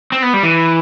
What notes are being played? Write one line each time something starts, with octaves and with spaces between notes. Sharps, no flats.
C4
B3
G3
E3